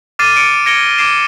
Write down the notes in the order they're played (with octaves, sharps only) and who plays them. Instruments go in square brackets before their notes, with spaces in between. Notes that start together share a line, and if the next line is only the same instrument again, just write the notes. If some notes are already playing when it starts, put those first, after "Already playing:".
[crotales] D6 F6 A6 C7 D#7
C#7 D7
G#6 A#6 C#7 D7 G7
D6 G#6 A6 C7 D7 E7